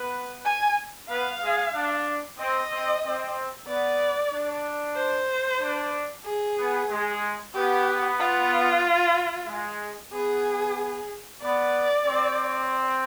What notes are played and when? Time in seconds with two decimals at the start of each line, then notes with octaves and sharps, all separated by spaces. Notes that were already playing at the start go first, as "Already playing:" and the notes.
Already playing: B3 B4
0.45 G#5
1.09 B3 B4 F5
1.42 G#3 G#4
1.74 D4
2.39 C4 D#5
2.72 C4
3.04 C4
3.68 B3 D5
4.32 D4
4.96 C5
5.62 D4
6.26 G#4
6.58 B3
6.91 G#3
7.54 B3 G4
8.19 F4
9.48 G#3
10.12 B3 G#4
11.42 B3 D5
12.07 C4